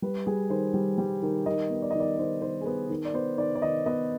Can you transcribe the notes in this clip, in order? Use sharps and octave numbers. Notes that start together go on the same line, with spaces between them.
G3 B4
G3 G#4
D#3 C5
G3
G3
D#3
D#3 D#5
B3
D5
D#5
D#3
D5
D#3 C5
D#3 C5
G#4
B3 B4
D#3
D5
B3 C5
D#3 D5
D5
D#3 D#5
B3 D#5